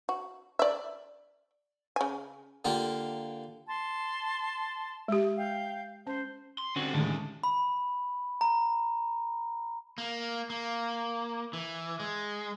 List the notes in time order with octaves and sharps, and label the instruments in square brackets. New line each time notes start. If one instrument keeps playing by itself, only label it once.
[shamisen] F#4
D5 E5
C#3 G#5
[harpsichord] D3 A#3 F4 G4
[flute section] A5 C6
[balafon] G#3 G4
[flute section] F5 G5
[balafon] C#4 [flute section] C5
[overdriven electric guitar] C6
[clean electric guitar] D3 C4 F#4 [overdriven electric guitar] G3 C#4
[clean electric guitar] D2 A2 [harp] D3 D#3 G#3
[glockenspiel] B5
A#5
[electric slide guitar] A#3
A#3
E3
G#3